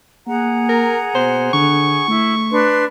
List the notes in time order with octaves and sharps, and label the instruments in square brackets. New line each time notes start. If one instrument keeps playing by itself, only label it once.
[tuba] A#3 [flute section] G#4 F#5 A#5
[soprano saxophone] A#4
[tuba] B2 [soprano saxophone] C5
[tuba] D3 [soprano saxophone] C#6
[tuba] A3 [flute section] E4
[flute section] D4 B4 C6